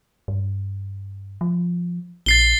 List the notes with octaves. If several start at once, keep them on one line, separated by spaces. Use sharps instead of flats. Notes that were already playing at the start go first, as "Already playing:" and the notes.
G2
F3
A#1 A6 C7 G7